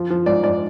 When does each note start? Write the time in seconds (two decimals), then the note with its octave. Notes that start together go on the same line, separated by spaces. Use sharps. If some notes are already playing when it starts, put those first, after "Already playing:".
Already playing: F3
0.10 F3
0.26 G#2 D5
0.43 G#2 D5